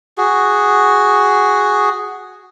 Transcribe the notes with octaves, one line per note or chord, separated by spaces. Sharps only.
F#4 G#4